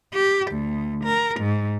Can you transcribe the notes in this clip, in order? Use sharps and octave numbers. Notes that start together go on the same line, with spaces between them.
G4
D2
A#4
G#2